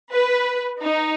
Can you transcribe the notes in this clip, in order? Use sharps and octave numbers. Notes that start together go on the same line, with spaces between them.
B4
D#4